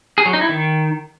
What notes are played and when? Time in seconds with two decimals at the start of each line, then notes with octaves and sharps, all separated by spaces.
0.18 G#4
0.26 F#3
0.33 D#4
0.41 E4
0.49 D#3